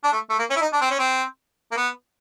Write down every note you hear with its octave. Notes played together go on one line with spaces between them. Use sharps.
D4
A3
A3
A#3
C#4
E4
D#4
D4
C4
C#4
C4
A#3
B3